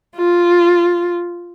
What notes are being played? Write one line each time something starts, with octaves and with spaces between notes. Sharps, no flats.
F4